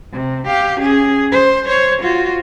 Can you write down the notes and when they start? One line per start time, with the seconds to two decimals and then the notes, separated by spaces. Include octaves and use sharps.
0.13 C3
0.47 G4 F5
0.80 C#4 G#4
1.32 C5
1.67 C5 C#5
2.02 F4 F#4